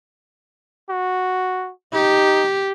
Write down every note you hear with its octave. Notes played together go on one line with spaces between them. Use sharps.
F#4
D#4 G4